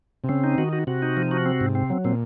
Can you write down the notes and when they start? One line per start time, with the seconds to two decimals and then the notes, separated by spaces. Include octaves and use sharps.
0.24 C3
0.29 C#3 C4
0.44 D#4
0.58 D#3 F#4
0.73 F#4
0.87 C3 F#4
1.02 D#4
1.17 F3
1.31 F#4
1.46 C4
1.61 G#2
1.75 C4
1.90 F#3
2.04 A#2 C4